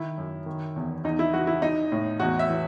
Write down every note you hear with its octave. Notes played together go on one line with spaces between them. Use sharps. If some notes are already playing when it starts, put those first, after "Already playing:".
Already playing: D#3 E4
F#2
D#3
E2
E2 D#4
E4
E3 F#4
E4
E3 D#4
A2
E2 F#4
E5
E3